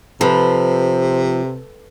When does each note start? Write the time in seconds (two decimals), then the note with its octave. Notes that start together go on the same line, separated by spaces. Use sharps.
0.21 C3 F3 A4 B4